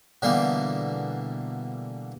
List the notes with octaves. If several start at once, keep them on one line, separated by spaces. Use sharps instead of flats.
B2 D3 E3 G3 A#3